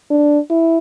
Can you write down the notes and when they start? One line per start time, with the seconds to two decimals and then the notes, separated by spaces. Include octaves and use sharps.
0.11 D4
0.50 E4